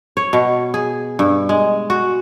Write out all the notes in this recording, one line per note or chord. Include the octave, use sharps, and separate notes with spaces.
C#5
B2
G#4
G2
G#3
F#4